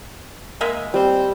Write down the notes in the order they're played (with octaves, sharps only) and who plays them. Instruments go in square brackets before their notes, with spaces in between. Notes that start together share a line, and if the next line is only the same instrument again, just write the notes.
[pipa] G#3 A#3 E5
[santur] G3 [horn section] C4